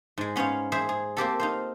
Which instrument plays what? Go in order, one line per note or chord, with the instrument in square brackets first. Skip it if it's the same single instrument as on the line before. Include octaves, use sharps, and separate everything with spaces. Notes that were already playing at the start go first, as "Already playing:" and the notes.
[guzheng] G#2 G#3
B3 C#4 C5 C#5 F5
G#4 C5 E5
G#4
A#3 C4 G4 A4
D#4 F4 C5